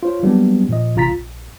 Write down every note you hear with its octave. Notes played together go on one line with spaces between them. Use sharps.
F4 C5 C#5
F#3 G3 A#3 B3 D4
A#2 F3 D#5
A1 C3 F4 A#5 A6 B6
A#1